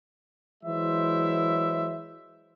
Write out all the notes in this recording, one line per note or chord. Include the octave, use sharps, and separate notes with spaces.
E3 F#3 G#3 E4 C5 E5